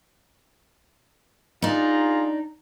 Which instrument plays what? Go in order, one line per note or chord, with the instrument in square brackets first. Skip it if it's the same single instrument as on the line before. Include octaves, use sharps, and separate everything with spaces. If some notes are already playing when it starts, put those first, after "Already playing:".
[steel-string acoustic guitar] D4 D#4 [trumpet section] F4 G#4 A#5